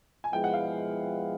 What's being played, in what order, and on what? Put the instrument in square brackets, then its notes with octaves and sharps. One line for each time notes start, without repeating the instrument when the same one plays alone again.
[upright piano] G#5
[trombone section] F3 G#3 B3 E4 [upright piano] G5
[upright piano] F#5
F5